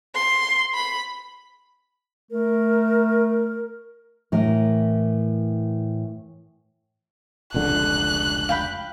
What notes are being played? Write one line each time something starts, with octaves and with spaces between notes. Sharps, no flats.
C6
B5
A3 A#4
A2 E3 A#4
F1 C#2 D3 F#6
F5 G5 B5